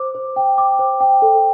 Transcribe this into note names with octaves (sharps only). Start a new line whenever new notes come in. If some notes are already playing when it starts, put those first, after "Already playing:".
Already playing: C5 D6
C5
G5
D6
C5
G5
A4